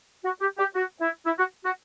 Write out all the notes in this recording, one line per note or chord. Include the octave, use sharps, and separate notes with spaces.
F#4
G4
G4
F#4
E4
E4
F#4
F#4